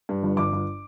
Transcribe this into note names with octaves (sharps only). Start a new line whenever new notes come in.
G2
G1
G1 D6
G1